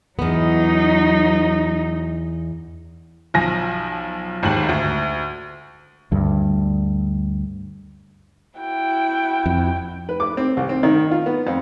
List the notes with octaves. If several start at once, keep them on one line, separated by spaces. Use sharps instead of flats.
E2 F#3 B3 D#4
B1 F3 G#5 A#6
G#1 D#2 G#2 F#7
D2
D2 G2
E4 F#4 G5
F2
B4
D6
C4
C2
C4
D#3
F4
B3
F2